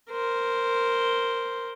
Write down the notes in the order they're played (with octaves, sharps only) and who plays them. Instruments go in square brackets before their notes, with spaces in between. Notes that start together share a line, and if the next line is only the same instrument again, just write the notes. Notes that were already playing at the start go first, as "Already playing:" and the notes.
[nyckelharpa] A#4 C5